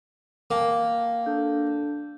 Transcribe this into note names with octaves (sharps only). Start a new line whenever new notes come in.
A#3 A#4 G5 A5
D4 A4 G6